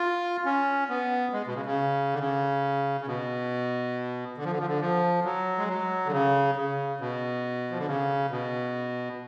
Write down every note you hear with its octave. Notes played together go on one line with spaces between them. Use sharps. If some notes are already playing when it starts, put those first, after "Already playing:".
Already playing: F4
C#4
B3
G#3
B2
C#3
C#3
D3
C#3
C#3
B2
D3
F3
D3
F3
D3
F3
F#3
G#3
F#3
D3
C#3
C#3
B2
F3
D3
C#3
B2